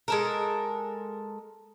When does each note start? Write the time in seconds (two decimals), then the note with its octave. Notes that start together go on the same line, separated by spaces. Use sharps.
0.08 G#3 A4 A#4